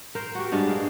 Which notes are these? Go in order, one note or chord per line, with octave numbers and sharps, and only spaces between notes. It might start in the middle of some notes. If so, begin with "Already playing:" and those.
A#4 C5
F#4 G4
G2 G#3 D4 E5
G#3 A#3